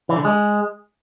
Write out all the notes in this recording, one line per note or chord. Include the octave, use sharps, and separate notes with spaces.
E3
D3
G#3